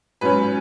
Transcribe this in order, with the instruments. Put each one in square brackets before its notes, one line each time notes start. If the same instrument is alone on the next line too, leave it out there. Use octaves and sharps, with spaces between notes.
[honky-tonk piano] G#2 F#3 C#4 B4